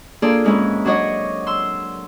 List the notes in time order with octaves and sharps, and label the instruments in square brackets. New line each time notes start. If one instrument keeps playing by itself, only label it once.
[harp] A#3 D4 F4 G#4 A4 D5
G#2 G#3 C4 C#4 E4
F#3 D4 F#4 C#5 D#5
C6 E6